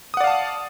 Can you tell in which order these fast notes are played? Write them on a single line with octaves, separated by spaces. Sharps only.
D#6 F#5 D5 F5 A5